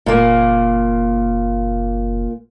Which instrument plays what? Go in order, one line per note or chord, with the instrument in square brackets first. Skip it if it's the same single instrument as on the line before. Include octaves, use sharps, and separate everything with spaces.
[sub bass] F#1 [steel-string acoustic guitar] A#2 A#3